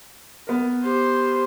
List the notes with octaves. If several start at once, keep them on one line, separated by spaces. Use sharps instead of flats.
B3 A#4
G4 C5